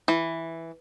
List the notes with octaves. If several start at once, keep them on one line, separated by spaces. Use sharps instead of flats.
E3